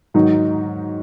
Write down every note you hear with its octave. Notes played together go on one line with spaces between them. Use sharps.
G#2 D#3 F#3 D#4